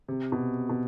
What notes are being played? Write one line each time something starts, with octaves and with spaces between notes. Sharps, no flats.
C3
B2
B2